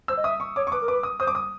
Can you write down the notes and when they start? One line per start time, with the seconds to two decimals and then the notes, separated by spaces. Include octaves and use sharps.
0.08 C5 E6
0.17 D#5
0.24 E5 D#6
0.40 C#6
0.56 C#5 D6
0.67 C#6
0.72 B4 D6
0.82 A#4
0.88 B4 D6
1.03 D#6
1.20 C5 D#6
1.27 D6
1.35 D#6